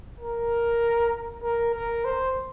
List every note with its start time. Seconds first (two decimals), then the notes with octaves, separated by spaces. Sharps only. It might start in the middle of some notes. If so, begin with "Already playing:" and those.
0.20 A#4
1.42 A#4
1.74 A#4
2.05 C5